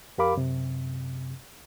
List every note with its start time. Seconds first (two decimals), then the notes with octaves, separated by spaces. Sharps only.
0.18 F2 G4 A#4 F5 B5 D6
0.36 F#2 C3